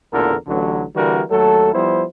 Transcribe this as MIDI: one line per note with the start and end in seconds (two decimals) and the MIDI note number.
0.12 0.35 33
0.12 0.35 40
0.12 0.35 46
0.12 0.35 50
0.12 0.35 69
0.12 0.35 70
0.47 0.85 33
0.47 0.85 50
0.47 0.85 54
0.95 1.22 50
0.95 1.22 52
0.95 1.22 55
0.95 1.22 58
0.95 1.22 66
0.95 1.22 70
1.30 1.74 39
1.30 1.74 54
1.30 1.74 57
1.30 1.74 69
1.74 2.04 53
1.74 2.04 55
1.74 2.04 59
1.74 2.04 64
1.74 2.04 72